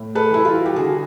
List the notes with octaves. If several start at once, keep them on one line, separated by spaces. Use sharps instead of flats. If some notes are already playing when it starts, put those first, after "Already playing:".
Already playing: A2
A4 B4
E3 G3 E4
F4
F#4
G4
D3 F#4 G#4